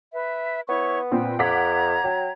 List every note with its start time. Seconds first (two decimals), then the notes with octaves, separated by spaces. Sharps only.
0.13 B4 E5
0.69 B3 E4 C#5 C#6
1.11 A#2 C4 B4 G5
1.39 F2 F#5 A#5 D6 G#6 B6
2.04 F#3 G5